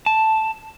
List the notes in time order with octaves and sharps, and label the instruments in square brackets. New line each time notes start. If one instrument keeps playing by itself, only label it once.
[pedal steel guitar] A5